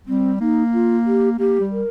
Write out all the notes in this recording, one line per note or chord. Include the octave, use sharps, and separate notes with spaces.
G3 C4
A#3 D#4
F4
G4
A#3 G4
G3
A#4